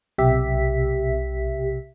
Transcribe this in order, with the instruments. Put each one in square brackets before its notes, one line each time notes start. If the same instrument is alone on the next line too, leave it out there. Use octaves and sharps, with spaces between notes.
[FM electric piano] B1 C3 G4 E5 B6